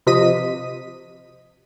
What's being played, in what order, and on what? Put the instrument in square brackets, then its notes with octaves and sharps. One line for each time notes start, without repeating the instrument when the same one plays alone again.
[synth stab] C3 F3 D#5 B6 D#7